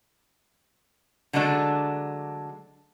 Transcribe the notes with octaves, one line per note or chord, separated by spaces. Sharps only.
D3 F#3 G#3 A3 D4 A4